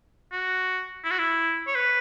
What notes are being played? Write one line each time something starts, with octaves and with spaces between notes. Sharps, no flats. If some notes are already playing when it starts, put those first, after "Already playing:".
F#4
E4
F#4
E4
C#5
B4